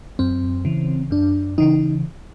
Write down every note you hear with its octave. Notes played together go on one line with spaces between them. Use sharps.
F#2 C4
C#3 E3
F#2 D4
C#3 E3 D#4